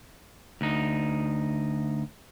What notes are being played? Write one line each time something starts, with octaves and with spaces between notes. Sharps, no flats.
D2 D#4